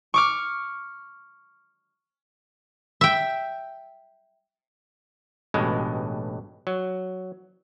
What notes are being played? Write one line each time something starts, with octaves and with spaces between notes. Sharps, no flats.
C#6 D6 F6
E5 G5
A1 G2 B2 G#3
F#3